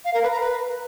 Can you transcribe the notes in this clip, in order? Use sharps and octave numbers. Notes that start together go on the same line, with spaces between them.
F5
A#4
B4
A#5
B4